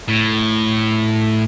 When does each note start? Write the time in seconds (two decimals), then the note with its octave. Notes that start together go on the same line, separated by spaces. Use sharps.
0.09 A2